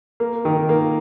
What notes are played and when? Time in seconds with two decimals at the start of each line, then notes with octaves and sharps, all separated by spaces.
0.20 A#3
0.45 D#3
0.69 A#3